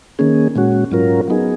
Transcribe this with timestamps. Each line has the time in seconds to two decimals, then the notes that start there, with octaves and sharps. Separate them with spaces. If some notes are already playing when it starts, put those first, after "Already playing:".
0.19 D#3 A#3 C#4 G#4
0.56 A#2 G#3 C#4 F#4
0.91 G#2 F#3 C#4 F4 A#4
1.28 F#3 B3 D#4 G#4